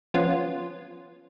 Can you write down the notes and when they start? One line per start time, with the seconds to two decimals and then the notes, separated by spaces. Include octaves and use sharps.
0.14 F3 B3 C#4 F4